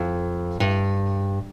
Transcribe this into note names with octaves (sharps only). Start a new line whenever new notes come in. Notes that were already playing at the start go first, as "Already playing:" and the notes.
Already playing: F2
G2